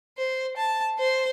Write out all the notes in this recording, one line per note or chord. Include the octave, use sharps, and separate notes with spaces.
C5
A5
C5